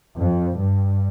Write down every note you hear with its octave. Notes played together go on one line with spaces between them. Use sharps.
F2
G2